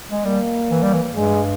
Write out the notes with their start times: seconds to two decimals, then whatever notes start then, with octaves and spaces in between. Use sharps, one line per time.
0.11 G#3
0.25 G3 A#3
0.70 E3
0.83 G3
0.94 E3
1.15 G2 G#3